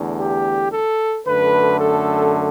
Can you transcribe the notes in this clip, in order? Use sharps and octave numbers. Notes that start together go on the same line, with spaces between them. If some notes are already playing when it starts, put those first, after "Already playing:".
Already playing: E2 D3 A3
G4
A4
F#2 D3 A3 B4
A4